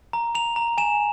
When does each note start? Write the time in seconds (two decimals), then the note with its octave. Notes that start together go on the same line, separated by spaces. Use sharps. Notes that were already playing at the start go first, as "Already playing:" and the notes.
0.13 A#5
0.35 A#5 F7
0.56 A#5
0.78 G#5 E7